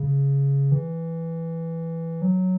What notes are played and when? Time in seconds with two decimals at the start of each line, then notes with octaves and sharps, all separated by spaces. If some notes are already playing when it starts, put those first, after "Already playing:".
Already playing: C#3
0.72 E3
2.22 F#3